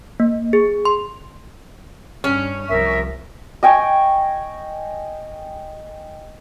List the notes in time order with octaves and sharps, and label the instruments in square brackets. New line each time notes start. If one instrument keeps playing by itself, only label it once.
[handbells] A#3
G#4
C6
[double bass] G2 [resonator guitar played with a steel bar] C#4
[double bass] C2 F3 [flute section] A#4 E5
[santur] D#5 G5 G#5 C#6